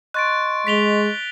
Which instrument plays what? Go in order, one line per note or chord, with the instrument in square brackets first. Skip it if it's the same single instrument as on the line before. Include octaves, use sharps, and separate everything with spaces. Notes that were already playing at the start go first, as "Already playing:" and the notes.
[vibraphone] D#5 C6 C#6 [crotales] F#6 A6 D7
[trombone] G#3 [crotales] B6 F7 G7